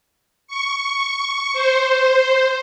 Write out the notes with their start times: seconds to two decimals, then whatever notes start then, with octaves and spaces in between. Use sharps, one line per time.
0.47 C#6
1.53 C5